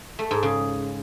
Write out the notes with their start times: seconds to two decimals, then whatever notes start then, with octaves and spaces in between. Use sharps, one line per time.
0.19 A3
0.31 G#2
0.43 C#3